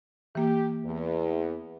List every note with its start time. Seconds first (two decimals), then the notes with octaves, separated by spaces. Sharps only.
0.35 E3 A#3 G4
0.85 E2